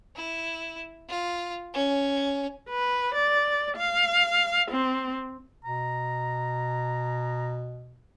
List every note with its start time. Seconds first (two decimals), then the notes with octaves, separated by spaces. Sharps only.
0.16 E4
1.09 F4
1.74 C#4
2.69 B4
3.14 D5
3.77 F5
4.71 C4
5.65 B2 A#5